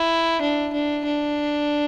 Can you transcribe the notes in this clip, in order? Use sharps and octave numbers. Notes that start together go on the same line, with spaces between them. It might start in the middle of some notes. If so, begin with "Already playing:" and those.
Already playing: E4
D4
D4
D4